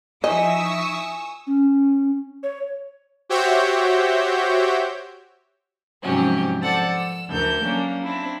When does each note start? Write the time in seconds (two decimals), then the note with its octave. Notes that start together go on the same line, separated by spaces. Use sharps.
0.24 F3 D#4 E4 D#5 G#5 C#6 D#6 E6
1.47 C#4
2.43 C#5
3.29 F#4 G4 C5 C#5 E5 G5
6.03 G#2 C3 F3 F#3 C#4 G4
6.62 F3 A4 C5 D5 F#5 A6
6.97 E6
7.30 D2 E3 A4 A#4 G6
7.63 F#3 A#3 C#4 D4
8.03 C4 D4 E4